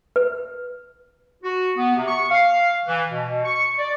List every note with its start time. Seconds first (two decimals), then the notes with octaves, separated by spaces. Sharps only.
0.16 B4
1.43 F#4
1.77 B3
1.96 C3
2.08 C#6
2.31 F5
2.86 E3
3.10 B2
3.45 C#6
3.79 D5